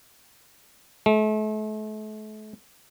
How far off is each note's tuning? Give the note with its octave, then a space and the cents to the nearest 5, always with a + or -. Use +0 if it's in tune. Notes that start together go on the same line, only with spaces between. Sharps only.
A3 -40